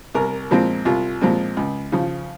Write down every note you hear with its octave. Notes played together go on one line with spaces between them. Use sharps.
C2 A#4
A#2 F3 G#3 C4
C2 F4
A#2 F3 G#3 C4
C#2
C#3 F3